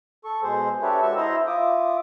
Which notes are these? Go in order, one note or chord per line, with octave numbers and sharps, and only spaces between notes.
A4 C#6
B2 G#3 G#4 C5
D4 G4 A4 B4 C#5 E5
G#3 F#4 C#6 E6
E4 C5 D#5 A#5 E6
F4 E5 D6 D#6